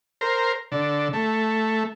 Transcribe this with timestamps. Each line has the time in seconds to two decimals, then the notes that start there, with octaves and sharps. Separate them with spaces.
0.21 A#4 C5
0.72 D3
1.13 A3